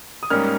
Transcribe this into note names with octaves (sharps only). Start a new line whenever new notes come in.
D#6
G#2 G3 A#3 C#4 F6